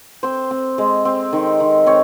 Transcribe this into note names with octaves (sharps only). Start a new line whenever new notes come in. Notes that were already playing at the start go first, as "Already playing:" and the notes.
C4 C5
C4
G#3
C4
D#3
D#3
C4 C#5